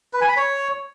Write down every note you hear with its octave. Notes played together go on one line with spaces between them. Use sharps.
B4
G#5
B5
C#5